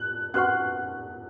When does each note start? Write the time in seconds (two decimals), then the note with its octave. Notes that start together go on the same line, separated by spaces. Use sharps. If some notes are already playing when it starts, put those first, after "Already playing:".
Already playing: F#6
0.34 C#4 F#4 B4 F#5 C#6 F#6